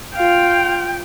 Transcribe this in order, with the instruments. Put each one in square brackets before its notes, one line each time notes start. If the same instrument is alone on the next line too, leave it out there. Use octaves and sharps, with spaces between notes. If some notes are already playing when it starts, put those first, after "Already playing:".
[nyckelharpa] F4 F5 [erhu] G5